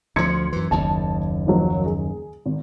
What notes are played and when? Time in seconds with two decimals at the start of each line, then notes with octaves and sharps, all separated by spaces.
0.16 D2 F3 C6 G#6 C#7
0.53 F#2 E3
0.71 F#1 D#2 A5
1.47 D#3 F3 F#3
1.86 G#4
2.45 G#1